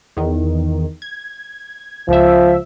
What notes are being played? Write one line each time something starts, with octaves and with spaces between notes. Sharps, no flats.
E2 D#3
G#6
C#2 F3 E5